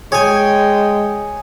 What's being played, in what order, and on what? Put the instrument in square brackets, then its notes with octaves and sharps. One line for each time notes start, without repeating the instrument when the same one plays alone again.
[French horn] G#3 [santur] G#4 [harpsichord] C#5 G#5 [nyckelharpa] G5